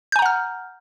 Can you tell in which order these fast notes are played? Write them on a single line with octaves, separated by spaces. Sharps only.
G6 G#5 A#5 F#5 F6